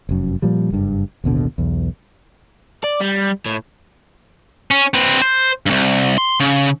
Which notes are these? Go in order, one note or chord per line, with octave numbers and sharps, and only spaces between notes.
F1 F#2
A#2 F3 G3
F#1 G2
A1 D#2 B2 D3
B1 E2
D5
G3
A2
C#4
C4 B4
C5
C2 G2
C6
C#3